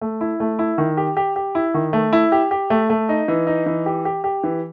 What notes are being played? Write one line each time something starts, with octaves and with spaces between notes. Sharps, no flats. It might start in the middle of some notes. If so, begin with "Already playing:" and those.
A3
E4
A3
E4
D#3
G4
G4
G4
E4
D#3
A3
E4
G4
G4
A3
A3
D#4
E3
D#4
E3
G4
G4
G4
E3